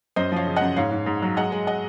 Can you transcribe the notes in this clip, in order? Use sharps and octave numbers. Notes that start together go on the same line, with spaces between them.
F#2 C5 D#5
F3 C#5 F5
C#3
F#2 D#5 F#5
G#2 C#5 F5
G#2
G#2
F#3
G#3 D#5 F#5
G#3
D#5 F#5